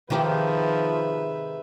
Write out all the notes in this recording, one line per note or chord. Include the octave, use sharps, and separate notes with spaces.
G#2 C3 D#3 F3 G4 B4 E5